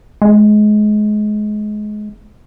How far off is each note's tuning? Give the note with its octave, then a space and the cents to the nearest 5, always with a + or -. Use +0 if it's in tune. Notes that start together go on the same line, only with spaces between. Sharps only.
G#3 +25